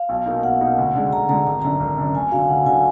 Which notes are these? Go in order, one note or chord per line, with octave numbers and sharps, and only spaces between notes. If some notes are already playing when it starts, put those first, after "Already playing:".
Already playing: F5
B1
B2 A#3 D#4
B1 F#5
B2 A#3 D#4
D2
D3 G#3
D2 A#5
D3 G#3 A#5
G#1 A#5
F#2 D3 A#5
G#1
F#2 D3
D2 G#5
D3 F#3 F5
D2 F#5
D3 F#3 G#5